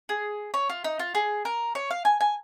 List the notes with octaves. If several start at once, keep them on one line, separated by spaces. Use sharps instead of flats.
G#4
C#5
F4
D#4
F4
G#4
A#4
C#5
F5
G#5
G#5